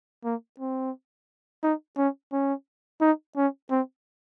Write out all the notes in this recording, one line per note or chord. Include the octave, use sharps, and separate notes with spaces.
A#3
C4
D#4
C#4
C#4
D#4
C#4
C4